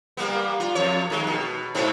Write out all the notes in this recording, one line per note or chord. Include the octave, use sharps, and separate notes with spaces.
G3 A#3 B3
F4
F2 C#5
D#3 G#3
B2
G#2 B2 C4